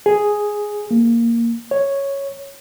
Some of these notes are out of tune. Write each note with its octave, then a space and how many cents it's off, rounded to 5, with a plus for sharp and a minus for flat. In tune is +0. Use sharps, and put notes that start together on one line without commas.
G#4 +0
A#3 -5
C#5 +0